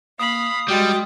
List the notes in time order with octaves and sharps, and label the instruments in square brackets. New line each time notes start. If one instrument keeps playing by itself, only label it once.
[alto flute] A#3 [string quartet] F5 B5 [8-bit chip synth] D#6
[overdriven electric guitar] G3 [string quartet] G#3 G5 A6 [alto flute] F#4